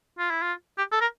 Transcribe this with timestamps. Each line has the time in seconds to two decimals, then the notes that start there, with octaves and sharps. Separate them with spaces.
0.19 F4
0.31 E4
0.42 F4
0.78 G4
0.92 A4
1.01 A#4